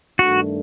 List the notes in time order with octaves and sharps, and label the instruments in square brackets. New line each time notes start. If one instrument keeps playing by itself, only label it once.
[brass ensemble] G2 D#3 A3 D4 [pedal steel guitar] F#4